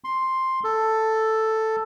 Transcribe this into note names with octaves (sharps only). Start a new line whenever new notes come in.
C6
A4